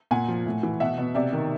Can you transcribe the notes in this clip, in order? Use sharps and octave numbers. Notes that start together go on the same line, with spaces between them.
A#2 F#5 G#5
F3
A2
E3
B2 E5 F#5
B2
C3 D5 E5
D#3